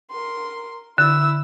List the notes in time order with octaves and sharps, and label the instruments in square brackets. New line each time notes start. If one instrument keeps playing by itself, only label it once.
[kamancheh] A#4 C6
[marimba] D3 [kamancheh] E4 E6